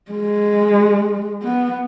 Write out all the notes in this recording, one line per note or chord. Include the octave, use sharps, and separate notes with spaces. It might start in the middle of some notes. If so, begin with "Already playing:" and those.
G#3
B3